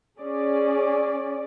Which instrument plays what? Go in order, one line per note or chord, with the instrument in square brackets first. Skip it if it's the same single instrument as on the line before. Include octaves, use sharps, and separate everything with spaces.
[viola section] C#4 G#4 D5